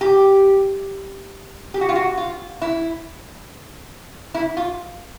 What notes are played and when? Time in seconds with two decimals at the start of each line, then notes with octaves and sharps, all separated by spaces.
0.01 G4
1.74 G4
1.81 F#4
1.89 F4
1.96 F#4
2.17 F4
2.62 E4
4.34 E4
4.57 F4